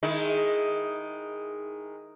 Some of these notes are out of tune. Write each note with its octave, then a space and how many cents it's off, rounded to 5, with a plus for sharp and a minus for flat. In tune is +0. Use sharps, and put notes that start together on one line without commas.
D#3 +0 G#3 +0 E4 -10